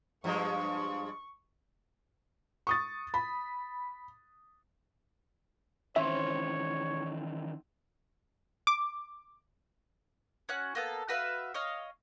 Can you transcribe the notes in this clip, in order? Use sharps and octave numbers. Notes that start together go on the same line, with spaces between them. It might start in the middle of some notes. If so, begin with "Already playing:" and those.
G2 F3 G#3 C#6
C#6 D#6 A6
B5
D#3 E3 C4 C#4 C#5 E5
D6
C#4 F#4 F#6
A#3 B3 A4
F#4 B4 E5 F5
C#5 D#5 F5